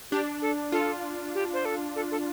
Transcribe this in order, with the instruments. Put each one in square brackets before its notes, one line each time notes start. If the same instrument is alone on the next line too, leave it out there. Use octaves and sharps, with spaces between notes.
[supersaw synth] D4 [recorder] G4
[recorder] A4
[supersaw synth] F4 [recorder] A4
[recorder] G4
C5
A4
A4
A4